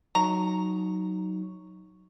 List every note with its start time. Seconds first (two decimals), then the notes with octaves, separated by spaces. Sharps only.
0.15 F#3 D#4 A#5 C#6